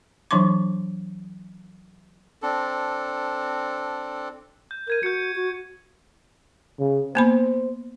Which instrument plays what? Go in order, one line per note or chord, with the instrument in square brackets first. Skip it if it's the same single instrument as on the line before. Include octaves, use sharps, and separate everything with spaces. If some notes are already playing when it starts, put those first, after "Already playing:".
[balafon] E3 F#3 D4 C6 D6
[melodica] C4 D4 A4
[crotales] G6
[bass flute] A#4 [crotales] G6 G#6 D#7
[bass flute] F#4 [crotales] G6 C#7
[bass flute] F#4
[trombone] C#3
[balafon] A#3 B3 B5 [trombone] C5